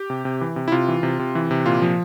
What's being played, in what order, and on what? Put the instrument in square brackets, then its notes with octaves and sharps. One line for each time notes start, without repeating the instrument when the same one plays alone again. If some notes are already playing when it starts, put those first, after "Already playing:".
Already playing: [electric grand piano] G4
C3
C3
E3
C3
E4
C3 F4
E3
C3
C3
E3
C3
A#2 F4
F3